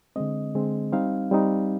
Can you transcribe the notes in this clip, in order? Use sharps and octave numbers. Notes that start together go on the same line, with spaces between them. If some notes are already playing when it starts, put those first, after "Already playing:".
D3 G#3 C4 D#5
D3 G#3 C4
G3 C4 D#4 F5
G3 C4 D#4